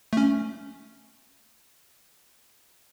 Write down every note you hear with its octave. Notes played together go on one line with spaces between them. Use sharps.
A3 C#4